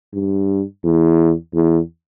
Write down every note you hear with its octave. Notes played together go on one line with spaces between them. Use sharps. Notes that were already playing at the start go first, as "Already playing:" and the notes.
G2
E2
E2